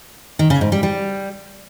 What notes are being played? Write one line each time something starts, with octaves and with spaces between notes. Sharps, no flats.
D#3
C#3
G#2
G3
G3